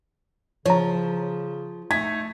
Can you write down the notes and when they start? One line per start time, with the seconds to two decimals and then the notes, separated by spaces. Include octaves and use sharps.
0.66 C#3 F3 C#5 A#5
1.91 A3 D#4 G#6 B6